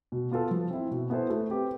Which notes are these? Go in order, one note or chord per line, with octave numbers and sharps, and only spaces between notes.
B2
B3 F4 A4
F3
C4 E4
B2
B3 E4 A4 C5
A3
C4 G4 B4